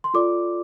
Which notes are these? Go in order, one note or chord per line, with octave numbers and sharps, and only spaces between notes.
C6
F4 A4 D5 D6